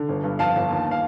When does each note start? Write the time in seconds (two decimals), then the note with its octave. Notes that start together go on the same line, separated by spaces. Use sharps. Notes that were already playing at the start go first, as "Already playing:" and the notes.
Already playing: D3
0.09 G1
0.24 G2
0.39 F2 F5 A5
0.55 G1
0.70 D#2
0.91 F5